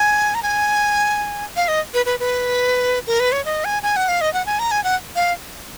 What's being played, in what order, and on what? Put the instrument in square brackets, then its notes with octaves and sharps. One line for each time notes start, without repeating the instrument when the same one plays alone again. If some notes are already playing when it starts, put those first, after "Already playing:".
Already playing: [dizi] G#5
A#5
G#5
F5
D#5
B4
B4
B4
A#4
B4
C#5
D#5
G#5
G#5
F#5
F5
D#5
F#5
G#5
A#5
G#5
F#5
F5